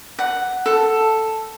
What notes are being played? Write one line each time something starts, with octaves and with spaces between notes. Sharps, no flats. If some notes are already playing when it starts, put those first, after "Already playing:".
F#5
A4